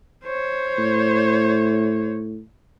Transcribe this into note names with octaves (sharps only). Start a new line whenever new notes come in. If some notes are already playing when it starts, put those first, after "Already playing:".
C5 C#5
A2